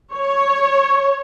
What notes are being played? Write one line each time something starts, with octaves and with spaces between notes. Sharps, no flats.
C#5